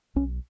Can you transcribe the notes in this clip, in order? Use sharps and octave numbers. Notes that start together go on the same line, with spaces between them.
B1 C#4